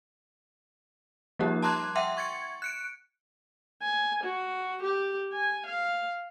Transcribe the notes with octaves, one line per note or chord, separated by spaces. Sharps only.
F3 G3 A#3 D#4 G4
A5 A#5 C6 D6 F#6 G#6
E5 F#5 G5 C6
C#6 G#6 A6 C#7
F#6 C#7 D7
G#5
F#4
G4
G#5
F5